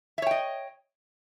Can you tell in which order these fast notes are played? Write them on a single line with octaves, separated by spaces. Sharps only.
E5 C#5 G5 D#5